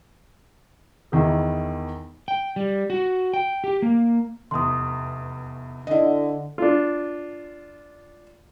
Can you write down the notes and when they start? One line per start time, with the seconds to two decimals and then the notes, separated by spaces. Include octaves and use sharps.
1.12 E2 D#3 E3
2.28 G5
2.56 G3
2.90 F#4
3.33 G5
3.64 G4
3.82 A#3
4.51 F1 E2 C6 D#6
5.87 D3 E4 D#5
6.58 D4 F4